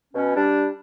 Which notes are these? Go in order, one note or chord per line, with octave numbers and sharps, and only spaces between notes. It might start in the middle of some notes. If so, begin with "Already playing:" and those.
B2 C#4
G3 D4